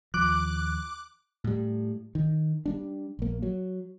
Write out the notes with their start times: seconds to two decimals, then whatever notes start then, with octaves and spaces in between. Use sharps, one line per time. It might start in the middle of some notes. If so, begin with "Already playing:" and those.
0.14 D#2 F3 D6 F#6
1.44 A2 G3
2.15 D#3
2.66 G3 A#3 D4
3.19 A#1 A#3
3.42 F#3